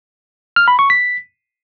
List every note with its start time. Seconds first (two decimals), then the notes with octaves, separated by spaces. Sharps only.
0.56 F6
0.68 B5
0.79 C#6
0.90 B6